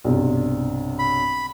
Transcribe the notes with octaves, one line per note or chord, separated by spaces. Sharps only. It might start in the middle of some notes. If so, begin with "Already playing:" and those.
B1 G2 C3
B5